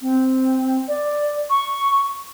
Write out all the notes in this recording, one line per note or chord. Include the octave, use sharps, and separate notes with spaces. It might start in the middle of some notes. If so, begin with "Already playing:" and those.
C4
D5
C#6